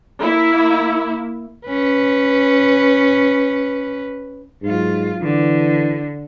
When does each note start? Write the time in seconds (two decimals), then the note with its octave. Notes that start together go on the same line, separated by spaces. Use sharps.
0.23 A#3 E4
1.67 C#4 B4
4.63 G#2 F#3 F4
5.22 D3 E3